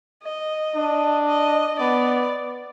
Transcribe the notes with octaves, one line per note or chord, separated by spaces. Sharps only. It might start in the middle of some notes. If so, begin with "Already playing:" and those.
D#5
D4
D#5
B3 D5